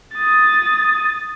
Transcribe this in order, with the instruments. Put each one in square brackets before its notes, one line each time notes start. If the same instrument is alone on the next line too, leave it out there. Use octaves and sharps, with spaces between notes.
[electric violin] D#6 A6